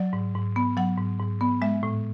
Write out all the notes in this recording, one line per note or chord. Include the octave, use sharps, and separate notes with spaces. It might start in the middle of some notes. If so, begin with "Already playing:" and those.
Already playing: F#3 D5
G#2
G#2
B3
F#3 F#5
G#2
G#2
B3
G#3 E5
A2